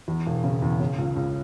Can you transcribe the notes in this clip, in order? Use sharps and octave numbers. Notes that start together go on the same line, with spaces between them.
E2
E1
C#3
E2
C#3
C#2
C#2